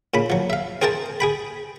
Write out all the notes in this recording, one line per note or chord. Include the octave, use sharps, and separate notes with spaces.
A#2 C#3 B5
F3 F#3
E5 F5
C4 G#4 A#4 C5 G5 A5
G#4 G5 B5